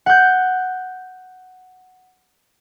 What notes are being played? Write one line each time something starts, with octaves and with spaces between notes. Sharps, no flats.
F#5 G6